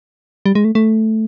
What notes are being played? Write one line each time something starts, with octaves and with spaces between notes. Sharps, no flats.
G3
G#3
A3
A3